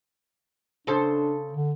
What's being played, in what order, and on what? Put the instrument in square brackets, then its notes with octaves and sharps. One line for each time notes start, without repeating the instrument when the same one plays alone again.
[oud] C#3 A4 C5 [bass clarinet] D4
[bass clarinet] D3